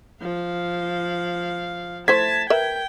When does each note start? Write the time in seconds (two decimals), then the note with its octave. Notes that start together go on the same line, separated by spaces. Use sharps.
0.21 F3 F5
2.08 A3 E4 C5 A5 G#6 B6
2.50 A#4 B4 E5 G5